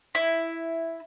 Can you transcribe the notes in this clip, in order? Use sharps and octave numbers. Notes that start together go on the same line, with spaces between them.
E4